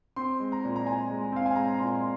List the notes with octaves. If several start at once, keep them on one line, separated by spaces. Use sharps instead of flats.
C4 C6
G#3
A#5
A#2
A#5
A#2 G#5
G#3
C4 F5
G#5
G#3 A#5
A#5
A#2 C6
C6